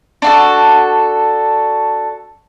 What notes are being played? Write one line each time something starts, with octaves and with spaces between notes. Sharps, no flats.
D4 F#4 A4